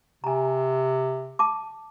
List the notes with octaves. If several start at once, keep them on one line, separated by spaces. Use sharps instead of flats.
C3 G#5 A#5
A5 D6